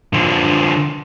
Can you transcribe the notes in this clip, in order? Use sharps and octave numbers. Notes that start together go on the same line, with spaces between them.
D3 F3